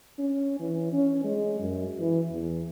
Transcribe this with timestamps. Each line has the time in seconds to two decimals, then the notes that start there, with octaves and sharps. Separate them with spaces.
0.19 C#4
0.60 E3
0.93 C#4
1.24 G#3
1.60 F#2
2.00 E3
2.31 E2